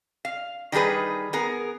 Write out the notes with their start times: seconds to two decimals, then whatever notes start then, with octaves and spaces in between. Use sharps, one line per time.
0.25 F5
0.72 D#3 G3 D#4 G#4 B4
1.33 B3 G#4 A#4